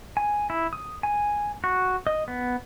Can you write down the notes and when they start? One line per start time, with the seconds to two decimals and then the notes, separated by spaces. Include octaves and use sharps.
0.17 G#5
0.50 E4
0.73 D#6
1.03 G#5
1.64 F#4
2.07 D#5
2.28 B3